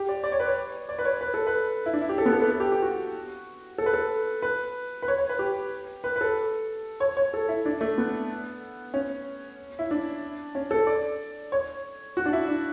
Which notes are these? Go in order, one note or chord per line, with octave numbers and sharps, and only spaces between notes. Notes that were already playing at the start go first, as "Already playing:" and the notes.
Already playing: G4
D5
D5
C#5
B4
C#5
D5
B4
C#5
B4
A4
B4
E4
D4
E4
G4
A4
B3
A4
B4
A4
G4
G4
F#4
A4
B4
A4
B4
B4
C#5
C#5
B4
G4
B4
B4
A4
C#5
C#5
A4
E4
D4
A3
B3
C#4
E4
D4
C#4
A4
D5
C#5
F#4
D4
E4
D4